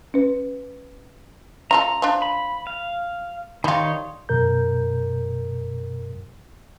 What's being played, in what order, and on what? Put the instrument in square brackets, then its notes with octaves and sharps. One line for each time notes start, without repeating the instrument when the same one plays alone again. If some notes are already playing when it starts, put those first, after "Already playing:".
[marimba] C#4 B4
[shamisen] C#4 F4 A4 [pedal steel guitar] A#5
[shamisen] F3 D4
[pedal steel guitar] B5
F5
[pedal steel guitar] D#3 D#4 C#5 [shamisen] G3 F4
[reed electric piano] F#2 B2 A#4 G6